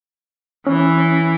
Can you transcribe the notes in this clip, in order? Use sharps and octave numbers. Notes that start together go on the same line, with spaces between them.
E3 C#4